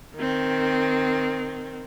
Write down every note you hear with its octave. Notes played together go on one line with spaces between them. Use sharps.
D#3 C4